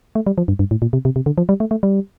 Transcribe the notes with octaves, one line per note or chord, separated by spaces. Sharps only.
A3
G3
F3
G2
G2
A2
A#2
C3
C3
C3
D3
F3
G3
A3
A3
G3